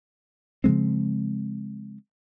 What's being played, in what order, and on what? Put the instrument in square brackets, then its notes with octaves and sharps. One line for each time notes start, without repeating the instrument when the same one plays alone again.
[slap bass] C#3 F3 G#3 C4